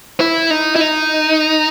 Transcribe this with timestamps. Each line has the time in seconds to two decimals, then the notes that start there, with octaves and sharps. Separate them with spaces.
0.21 E4
0.51 D#4
0.76 E4
0.81 D#4